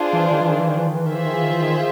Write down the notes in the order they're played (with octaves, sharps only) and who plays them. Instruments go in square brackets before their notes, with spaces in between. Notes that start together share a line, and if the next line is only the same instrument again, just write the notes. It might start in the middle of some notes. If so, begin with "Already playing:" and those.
Already playing: [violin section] D4 F4 G#4 C5
[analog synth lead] E3
D#3
E3
D#3
E3
D#3
E3
D#3
E3
[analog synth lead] D#3 [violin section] F4 G#4 C5 E5
[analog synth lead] E3
D#3
E3
D#3
E3
D#3